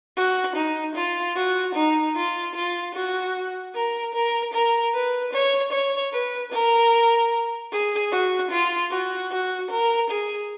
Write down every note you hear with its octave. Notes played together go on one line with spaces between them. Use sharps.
F#4
D#4
F4
F#4
D#4
F4
F4
F#4
A#4
A#4
A#4
B4
C#5
C#5
B4
A#4
G#4
F#4
F4
F#4
F#4
A#4
G#4